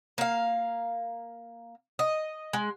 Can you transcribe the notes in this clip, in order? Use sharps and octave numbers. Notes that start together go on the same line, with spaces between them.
A#3 F5
D#5
G#3